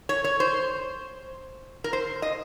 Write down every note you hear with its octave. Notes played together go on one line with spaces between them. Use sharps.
C#5
C#5
C5
A#4
C5
D#5